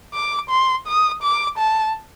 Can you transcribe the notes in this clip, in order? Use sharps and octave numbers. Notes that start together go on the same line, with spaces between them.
D6
C6
D#6
D6
A5